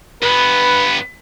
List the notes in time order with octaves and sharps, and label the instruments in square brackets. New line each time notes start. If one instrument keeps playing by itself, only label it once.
[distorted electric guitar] G2 B3 [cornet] B4